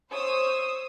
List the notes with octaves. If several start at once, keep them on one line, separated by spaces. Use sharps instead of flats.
C5 C#5 D#6 E6